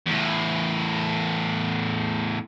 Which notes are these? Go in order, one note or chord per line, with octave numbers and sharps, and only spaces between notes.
E2 A2